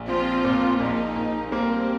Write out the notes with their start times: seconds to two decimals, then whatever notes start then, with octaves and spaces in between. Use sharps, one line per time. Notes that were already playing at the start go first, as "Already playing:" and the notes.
Already playing: A#1
0.08 F3 C4 F4
0.44 A#2
0.80 A#1 A#3 D#4
1.16 A#1
1.52 G3 A#3 C4